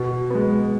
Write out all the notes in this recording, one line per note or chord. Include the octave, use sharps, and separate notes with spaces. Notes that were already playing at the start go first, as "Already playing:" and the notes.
Already playing: B2
G#3 B3